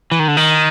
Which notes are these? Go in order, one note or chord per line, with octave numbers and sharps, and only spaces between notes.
E3
D#3
D3
D#3